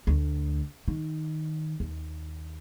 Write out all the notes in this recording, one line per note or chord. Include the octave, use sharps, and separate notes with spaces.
D2
D#3
D#2